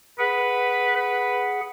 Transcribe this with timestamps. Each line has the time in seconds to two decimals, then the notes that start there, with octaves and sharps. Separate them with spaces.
0.19 G#4 B4 F#5
0.95 B4